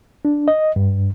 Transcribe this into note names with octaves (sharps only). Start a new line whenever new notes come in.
D4
D#5
G2